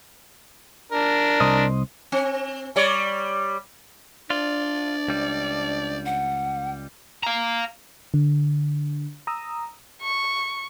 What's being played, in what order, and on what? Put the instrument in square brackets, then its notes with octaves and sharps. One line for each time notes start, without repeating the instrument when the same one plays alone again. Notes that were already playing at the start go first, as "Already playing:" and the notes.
[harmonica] D4 A#4
[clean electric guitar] C2 C5 D#5
[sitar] C4
G3 C#5 D5
[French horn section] D4 [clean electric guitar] F4 [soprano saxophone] D5
[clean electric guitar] C#2 G3
[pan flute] F#5
[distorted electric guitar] F5 A#5
[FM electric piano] D3
A#5 D#6 E6
[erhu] C#6